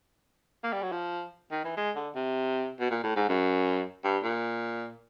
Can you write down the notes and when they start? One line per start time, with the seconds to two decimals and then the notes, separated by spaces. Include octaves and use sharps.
0.64 A#3
0.73 G3
0.82 F#3
0.92 F3
1.52 D#3
1.65 E3
1.77 G#3
1.96 D3
2.15 C3
2.80 B2
2.91 A#2
3.04 A2
3.16 G#2
3.29 F#2
4.05 G2
4.24 A#2